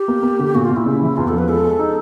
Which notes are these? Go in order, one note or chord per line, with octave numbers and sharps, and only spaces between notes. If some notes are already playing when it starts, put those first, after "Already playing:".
Already playing: G4
A#3
A#3
D3
A#2 F#4
F4
A#2
E4
C#3
E3
E2 F4
F3 A4
B4
G#3 A4
G#3
D#4